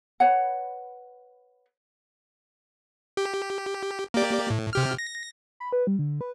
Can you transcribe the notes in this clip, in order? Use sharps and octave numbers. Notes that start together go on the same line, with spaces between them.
B4 C#5 F#5
G4
A#3 G4 D5
A2
C3 G4 F6
A#6
B5
B4
G3
D3
B4